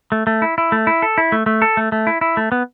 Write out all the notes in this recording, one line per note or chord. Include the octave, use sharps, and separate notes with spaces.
A3
A3
E4
E4
A3
E4
A4
E4
A3
A3
A4
A3
A3
E4
E4
A3
B3